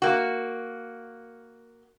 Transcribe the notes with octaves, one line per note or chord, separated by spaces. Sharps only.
A#3 F#4